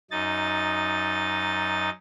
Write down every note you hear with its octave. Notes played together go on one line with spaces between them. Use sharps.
F#2 D#4 A6